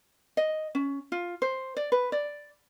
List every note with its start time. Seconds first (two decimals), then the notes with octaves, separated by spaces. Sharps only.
0.37 D#5
0.75 C#4
1.12 F4
1.42 C5
1.77 D5
1.92 B4
2.12 D5